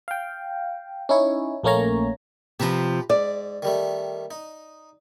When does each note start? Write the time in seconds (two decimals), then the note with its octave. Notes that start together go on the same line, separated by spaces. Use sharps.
0.08 F5 G5
1.09 C#4 D#4 E4 C#5
1.63 A#1 A3 A#3 C#4 C#5 A#5
2.60 C3 F3 G4 B4 A#5
3.10 G#2 D5
3.62 D#3 G3 A3
4.31 D#4